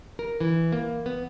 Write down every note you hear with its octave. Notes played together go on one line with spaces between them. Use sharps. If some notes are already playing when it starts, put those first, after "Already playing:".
A#4
E3
A#3
B3